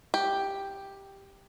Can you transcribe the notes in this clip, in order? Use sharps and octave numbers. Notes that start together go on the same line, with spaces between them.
G4